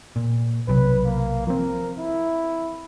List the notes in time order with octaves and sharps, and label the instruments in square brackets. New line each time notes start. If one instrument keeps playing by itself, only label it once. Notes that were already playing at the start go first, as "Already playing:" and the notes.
[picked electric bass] A#2
[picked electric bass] B1 C3 F#3 [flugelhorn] B4
[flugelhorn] A#3
[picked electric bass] F3 C4 [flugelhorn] A#4
[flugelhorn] E4